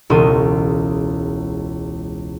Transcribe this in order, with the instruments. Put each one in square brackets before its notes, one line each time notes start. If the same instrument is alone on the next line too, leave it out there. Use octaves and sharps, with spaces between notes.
[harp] E1 C#2 C6 D#7